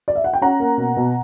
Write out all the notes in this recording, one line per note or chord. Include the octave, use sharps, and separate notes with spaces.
D5
E5
F#5
G5
C#4 F#5 A#5
A#3
B2
B2